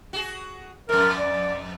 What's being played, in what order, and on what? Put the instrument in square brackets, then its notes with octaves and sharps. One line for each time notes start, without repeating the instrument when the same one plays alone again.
[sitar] F#4 G#4
[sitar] F2 G#2 [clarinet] A#4
[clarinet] D5